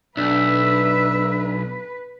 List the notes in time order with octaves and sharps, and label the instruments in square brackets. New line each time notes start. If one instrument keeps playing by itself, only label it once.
[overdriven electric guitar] B1 [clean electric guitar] D4 [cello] B4 [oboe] E5